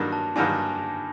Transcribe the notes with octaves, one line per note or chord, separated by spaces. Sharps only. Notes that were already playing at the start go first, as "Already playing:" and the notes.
Already playing: G2 D#3 F#3 A#3 D4
A5
G2 D#3 F#3 A#3 D4 G#5
A5